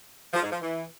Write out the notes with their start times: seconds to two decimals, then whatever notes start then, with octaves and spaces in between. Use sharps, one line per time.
0.34 F3
0.43 G#2
0.52 F3
0.61 E3